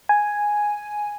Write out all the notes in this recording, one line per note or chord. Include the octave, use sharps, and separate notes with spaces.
G#5